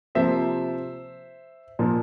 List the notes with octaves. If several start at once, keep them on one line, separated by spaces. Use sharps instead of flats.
C3 F3 A#3 C5 E5
A#2 F3 A#3